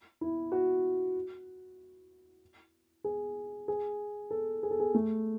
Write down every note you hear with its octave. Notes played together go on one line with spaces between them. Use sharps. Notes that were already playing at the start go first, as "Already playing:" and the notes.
E4
F#4
G#4
G#4
A4
G#4
A4
G#4
A3